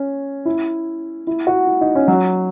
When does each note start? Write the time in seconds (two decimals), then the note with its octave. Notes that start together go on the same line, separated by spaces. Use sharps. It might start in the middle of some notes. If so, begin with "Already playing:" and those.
Already playing: C#4
0.45 E4
1.27 E4
1.47 F#4
1.67 E4
1.81 D#4
1.95 C#4
2.08 F#3